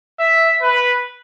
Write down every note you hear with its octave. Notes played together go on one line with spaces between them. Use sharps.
E5
B4